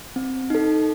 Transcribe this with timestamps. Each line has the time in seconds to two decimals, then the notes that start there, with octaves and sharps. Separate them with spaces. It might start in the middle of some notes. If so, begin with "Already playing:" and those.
0.16 C4
0.50 D#4 A4